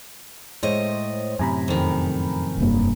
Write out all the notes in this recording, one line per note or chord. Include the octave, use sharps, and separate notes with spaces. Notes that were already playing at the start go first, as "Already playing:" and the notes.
A2 G#3 C5 C#5 D#5
F#2 A2 C3 G#5 A#5 B5
F2 D#3
F1 G2 A#3